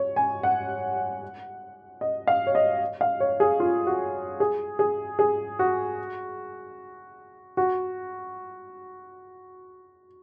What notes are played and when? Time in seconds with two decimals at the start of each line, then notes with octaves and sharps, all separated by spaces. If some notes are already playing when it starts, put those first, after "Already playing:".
Already playing: C#5
0.16 G#5
0.43 F#5
2.01 D#5
2.27 F5
2.47 C#5
2.55 D#5
3.01 F5
3.20 C#5
3.40 G#4
3.60 F4
3.87 F#4
4.40 G#4
4.79 G#4
5.19 G#4
5.59 F#4
7.57 F#4